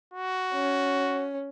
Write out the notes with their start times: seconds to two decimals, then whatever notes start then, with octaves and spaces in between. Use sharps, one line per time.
0.14 F#4
0.54 C#4